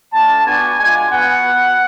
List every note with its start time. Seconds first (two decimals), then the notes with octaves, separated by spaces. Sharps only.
0.13 A3 D4 F4 A5
0.45 B3 D4 F#4 G#5
0.78 G#3 D4 F4 G#5
1.11 B3 F#4 F#5
1.44 B3 F#4